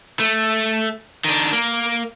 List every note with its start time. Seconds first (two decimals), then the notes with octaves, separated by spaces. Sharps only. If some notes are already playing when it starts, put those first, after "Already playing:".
0.20 A3
1.25 D#3 D4
1.53 A#3